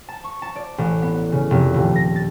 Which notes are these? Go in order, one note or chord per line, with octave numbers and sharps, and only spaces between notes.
A5
C#6
A5
D5
A1
B3
C#3
F1
D#1
A#6
A6